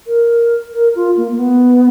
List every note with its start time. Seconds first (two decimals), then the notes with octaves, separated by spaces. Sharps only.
0.07 A#4
0.73 A#4
0.95 F4
1.17 A#3
1.31 A#3
1.39 B3